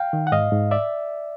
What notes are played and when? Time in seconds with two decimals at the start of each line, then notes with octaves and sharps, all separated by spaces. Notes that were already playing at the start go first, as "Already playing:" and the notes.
Already playing: F5 G5
0.13 D#3
0.27 F#5
0.32 G#2 D#5 F5
0.52 G#2
0.71 D5 E5